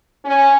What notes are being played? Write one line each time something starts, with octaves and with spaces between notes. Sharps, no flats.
C#4